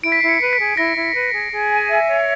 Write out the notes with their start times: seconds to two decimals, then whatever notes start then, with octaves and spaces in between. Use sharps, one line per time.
0.03 E4 D7
0.12 B6
0.20 E4 C7
0.29 C#7
0.40 B4
0.53 B6
0.59 G#4
0.77 E4 A#6
0.96 E4
1.15 B4
1.33 G#4
1.52 G#4
1.70 G#5
1.89 E5
2.07 C#5